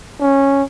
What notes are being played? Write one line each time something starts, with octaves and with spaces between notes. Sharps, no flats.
C#4